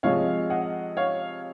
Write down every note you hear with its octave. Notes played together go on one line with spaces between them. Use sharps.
C3 F3 G#3 C#5 F5
D#5 F#5
C#5 F5